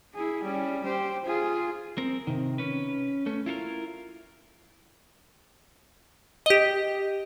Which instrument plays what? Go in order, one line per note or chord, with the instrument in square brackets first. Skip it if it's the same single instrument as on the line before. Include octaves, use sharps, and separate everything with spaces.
[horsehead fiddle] E4 G#4
G3 C#4
G4 C5
F4 G#4
[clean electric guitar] C4 A#4
C3 D#3
C#4 B4
A3 C#4
E4 F4 A4 A#4
[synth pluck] G4 D#5